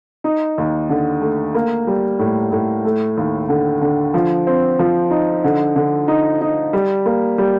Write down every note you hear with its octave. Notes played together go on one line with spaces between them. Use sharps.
D#4
D#2
D3
A3
A#3
G3
A2
A2
A3
D#2
D3
D3
F3
C4
F3
D#4
D3
D3
D#4
D#4
G3
A#3
G3